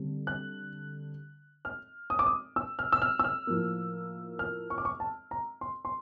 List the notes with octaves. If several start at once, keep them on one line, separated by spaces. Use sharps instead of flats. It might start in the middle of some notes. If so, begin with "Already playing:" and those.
Already playing: D3 G3 C4
F#6
F6
D#6
D6
D#6
E6
F6
E6
F6
E6
F6
A2 F3 A#3
F6
C#6
D6
C#6
A5
A#5
C6
C6